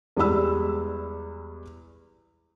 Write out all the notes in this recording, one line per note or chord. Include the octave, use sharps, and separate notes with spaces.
E2 G3 G#3 B5 E6